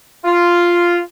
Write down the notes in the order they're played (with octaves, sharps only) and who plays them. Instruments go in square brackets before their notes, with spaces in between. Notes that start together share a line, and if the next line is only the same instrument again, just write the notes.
[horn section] F4